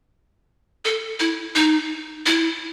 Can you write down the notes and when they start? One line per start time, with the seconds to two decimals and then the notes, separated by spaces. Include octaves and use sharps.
0.85 A4
1.20 E4
1.55 D#4
2.26 E4